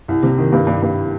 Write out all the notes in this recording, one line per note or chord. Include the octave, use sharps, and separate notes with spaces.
C2
C3
D#3
G2
G2
G2